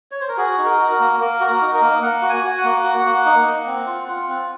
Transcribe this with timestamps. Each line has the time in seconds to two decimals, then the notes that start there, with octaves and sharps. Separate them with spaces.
0.12 C#5
0.21 C5
0.29 A#4
0.37 F#4 G#4
0.58 D#4
0.65 A#4
0.79 F#4
0.92 A#4
1.00 A#3
1.20 A#3 A#4
1.40 F#4
1.47 A#4
1.61 D#4
1.75 A#4
1.81 A#3
2.02 A#3 F#5
2.22 F#4
2.30 G#5
2.44 F#4
2.58 F#5
2.64 A#3
2.84 F#4
3.06 A#3
3.26 D#4
3.46 A#3
3.66 C4
3.87 F4
4.08 F4
4.29 C4